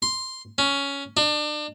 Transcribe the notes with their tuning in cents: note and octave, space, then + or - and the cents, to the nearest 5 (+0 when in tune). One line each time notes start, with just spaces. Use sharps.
C6 +0
C#4 +10
D4 +35